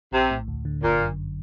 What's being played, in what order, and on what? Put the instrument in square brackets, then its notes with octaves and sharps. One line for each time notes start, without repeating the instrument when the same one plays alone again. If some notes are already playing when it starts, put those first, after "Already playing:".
[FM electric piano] A#1 [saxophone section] C3
[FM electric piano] A2
D2
D3
[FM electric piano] G1 [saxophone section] A#2
[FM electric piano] F#2